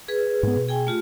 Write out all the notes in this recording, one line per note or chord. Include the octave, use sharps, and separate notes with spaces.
G#4 B4
G#2 B3
B2
G#4 G5 G#5
A3 F4 G4